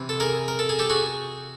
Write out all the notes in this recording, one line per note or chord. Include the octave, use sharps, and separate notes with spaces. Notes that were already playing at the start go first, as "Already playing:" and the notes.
Already playing: C3 E3
A4
G#4 A#4
A#4
A4
G#4
G4 A4
F#4 G#4